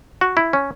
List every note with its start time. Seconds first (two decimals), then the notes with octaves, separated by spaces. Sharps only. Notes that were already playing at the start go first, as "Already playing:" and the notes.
0.21 F#4
0.37 E4
0.53 C#4